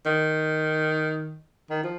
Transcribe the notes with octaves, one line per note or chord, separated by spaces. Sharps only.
D#3
D#3
F3